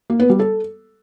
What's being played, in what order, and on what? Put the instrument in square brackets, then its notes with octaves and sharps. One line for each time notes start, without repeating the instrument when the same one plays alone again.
[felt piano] A#3
B3
G3
A4